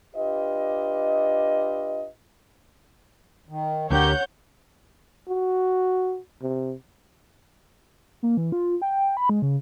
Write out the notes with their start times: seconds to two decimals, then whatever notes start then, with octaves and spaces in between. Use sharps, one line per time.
0.15 D4 F4 G4 B4 D#5
3.49 D#3
3.90 D2 C#4 D4 G4 A#4 C#5 F#5 G6
5.28 F#4
6.42 C3
8.23 A#3
8.37 E3
8.52 F4
8.82 G5
9.17 B5
9.29 G#3
9.42 C#3